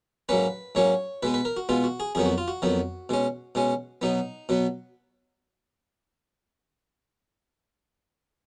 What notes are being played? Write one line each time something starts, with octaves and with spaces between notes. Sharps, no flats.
G#2 F#3 A#3 C#4 B4
G#2 F#3 A#3 C#4 C#5
B2 G#3 B3 B4
B4
A#4
F#4
B2 G#3 B3 F4
F#4
G#4
F2 D#3 F#3 B3 G#4
F#4
F4
F#4
F2 D#3 F#3 B3
B2 G#3 C#4
B2 G#3 C#4
B2 F#3 B3 D#4
B2 F#3 B3